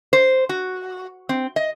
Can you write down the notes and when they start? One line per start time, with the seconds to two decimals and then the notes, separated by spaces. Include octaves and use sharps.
0.13 C5
0.49 F#4
1.29 C4
1.56 D#5